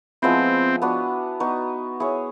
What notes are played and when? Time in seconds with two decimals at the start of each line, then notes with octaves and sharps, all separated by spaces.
0.22 F3 G#3 B3 C4 E4
0.82 B3 D4 F#4
1.40 B3 D#4 F#4
2.00 E4 G#4 C#5